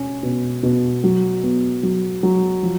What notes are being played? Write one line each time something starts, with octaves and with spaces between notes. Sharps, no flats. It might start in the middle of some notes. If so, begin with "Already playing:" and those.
Already playing: B2 C#4
B2
B2
F#3
B3
F#3
F#3
F3